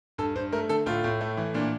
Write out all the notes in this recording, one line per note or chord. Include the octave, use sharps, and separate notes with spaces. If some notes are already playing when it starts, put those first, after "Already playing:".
G2 A4
G2 C5
A3 A#4
D3 A4
A2 F4
A2
A3
E3
A#2 D4